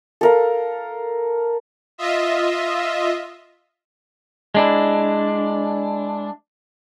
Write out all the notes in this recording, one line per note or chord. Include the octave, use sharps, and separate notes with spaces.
A4 A#4 F5
F4 D#5 E5
G#3 D4 E4